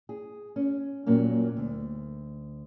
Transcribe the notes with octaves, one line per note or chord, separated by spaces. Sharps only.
G#4
C#4
F2 A#2 F#3 A#3 C#4
D2